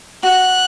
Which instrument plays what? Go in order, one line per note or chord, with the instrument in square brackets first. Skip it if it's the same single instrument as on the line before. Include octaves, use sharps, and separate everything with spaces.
[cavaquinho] F#4 [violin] F#6